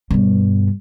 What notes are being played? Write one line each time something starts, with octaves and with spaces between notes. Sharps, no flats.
G2 B2